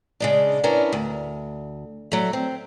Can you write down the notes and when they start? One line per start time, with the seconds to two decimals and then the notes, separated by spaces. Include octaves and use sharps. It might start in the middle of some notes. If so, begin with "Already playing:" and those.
0.20 C#3 G#3 D4
0.63 B3 C#4 D4 E4 A#4
0.93 D2
2.12 F#3 A3
2.33 C4